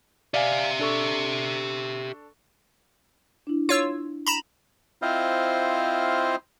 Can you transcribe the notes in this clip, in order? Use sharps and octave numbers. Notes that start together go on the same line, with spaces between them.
G4 D5 E5 F5 G#5
D4 A4 C#6
D4 E4
F4 C#5 E6
A#5 B5 E7
C4 E4 F4 C5 D#5 F5